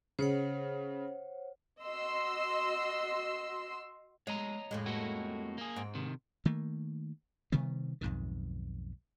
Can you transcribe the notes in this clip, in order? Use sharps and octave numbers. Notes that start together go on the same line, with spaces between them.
C#3 C5 C#5 F#5
F#4 D#5 C6 E6
G#3 C#5 D#5 A#5
F2 A2 G#3
A3 A#3 F#4
A#3 G#4
G#2 C4
C3 D#3
D#3 A3 A#3
C3 D#3 G3 B3
B1 F2 G#2 D#3